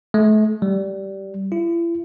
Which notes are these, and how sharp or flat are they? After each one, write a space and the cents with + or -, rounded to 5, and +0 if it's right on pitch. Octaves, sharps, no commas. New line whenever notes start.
A3 -40
G3 -15
E4 +40